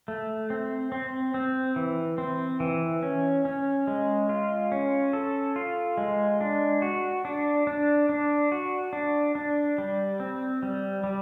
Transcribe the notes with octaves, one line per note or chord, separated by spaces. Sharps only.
A3
C4
C4
C4
E3
C4
E3
C#4
C#4
G#3
F4
C#4
A4
F4
G#3
D4
F#4
D4
D4
D4
F#4
D4
D4
G3
C4
G3
G3